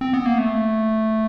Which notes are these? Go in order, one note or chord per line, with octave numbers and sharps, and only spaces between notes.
C4
B3
A#3
A3